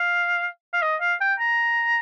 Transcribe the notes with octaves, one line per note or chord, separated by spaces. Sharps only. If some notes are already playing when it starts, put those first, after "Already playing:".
Already playing: F5
F5
D#5
F5
G5
A#5